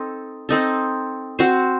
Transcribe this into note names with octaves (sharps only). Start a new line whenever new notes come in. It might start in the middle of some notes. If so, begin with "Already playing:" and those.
Already playing: C4 D#4 A4
C4 D#4 A4
C4 F#4 C5